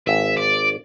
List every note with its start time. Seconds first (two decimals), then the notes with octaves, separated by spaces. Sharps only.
0.07 G#1 E5
0.37 D5